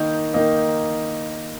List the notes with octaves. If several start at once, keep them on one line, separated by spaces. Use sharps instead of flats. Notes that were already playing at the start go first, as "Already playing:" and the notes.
Already playing: D#3 A#3 D#4 G6
D#3 A#3 D#4